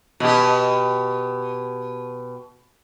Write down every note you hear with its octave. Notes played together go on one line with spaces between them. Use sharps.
B2 G4